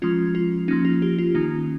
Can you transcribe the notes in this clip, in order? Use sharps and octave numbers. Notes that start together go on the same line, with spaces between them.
F3 G#3 C#4 F4
F4
F3 A#3 C#4 D#4
F4
G4
F4
D#3 A#3 C#4 D#4